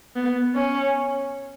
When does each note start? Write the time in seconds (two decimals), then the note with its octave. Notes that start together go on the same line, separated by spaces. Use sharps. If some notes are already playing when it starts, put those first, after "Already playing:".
0.16 B3
0.55 C#4